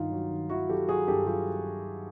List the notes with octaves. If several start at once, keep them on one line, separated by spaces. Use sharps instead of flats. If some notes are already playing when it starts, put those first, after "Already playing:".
Already playing: G2 D#3 D#4 F4
F#3
D#3
D#3 E4 F#4
F#3 G4 A4
F#3 F#4 G#4
G2 G4 A4
F#3 F4 G4